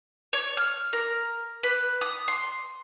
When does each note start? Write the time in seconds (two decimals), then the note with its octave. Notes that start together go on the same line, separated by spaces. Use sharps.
0.33 C#5
0.57 F6
0.93 A#4
1.63 B4
2.01 D#6
2.28 C6